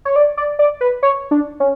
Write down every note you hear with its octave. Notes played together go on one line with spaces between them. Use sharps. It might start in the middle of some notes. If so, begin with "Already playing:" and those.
C#5
D5
D5
D5
B4
C#5
D4
C#4